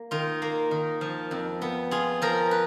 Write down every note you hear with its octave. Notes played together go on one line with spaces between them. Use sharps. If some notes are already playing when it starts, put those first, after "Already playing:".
Already playing: A#3
D#3 F4
A#3
D#3
F3
F2
B3
F4 G#4
F3 A#4
B4